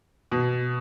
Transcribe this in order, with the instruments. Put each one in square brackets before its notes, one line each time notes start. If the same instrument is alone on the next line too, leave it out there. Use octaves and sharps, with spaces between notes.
[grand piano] B2